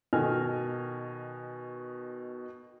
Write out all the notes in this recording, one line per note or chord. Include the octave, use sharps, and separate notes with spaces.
B2 D#3 A4 D#5 G#5 F6